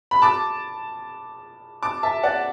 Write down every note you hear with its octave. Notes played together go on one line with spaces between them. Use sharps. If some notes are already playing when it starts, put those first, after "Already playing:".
B5
A5 D6
A5 D6
E5 A5
D5 F#5